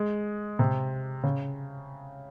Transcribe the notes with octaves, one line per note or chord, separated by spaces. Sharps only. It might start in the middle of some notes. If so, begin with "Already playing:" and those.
Already playing: G#3
C3
C#3